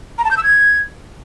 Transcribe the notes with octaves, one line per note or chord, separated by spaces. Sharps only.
A#5
A5
G6
E6
G#6